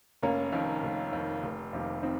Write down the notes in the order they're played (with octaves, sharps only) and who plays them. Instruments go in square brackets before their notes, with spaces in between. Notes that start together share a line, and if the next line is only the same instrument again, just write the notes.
[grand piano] F1 [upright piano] A#3 C#4
[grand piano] F2 D#3
F1
F2 D#3
F1
F2 C3 D#3 A#3
[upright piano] C4 D#4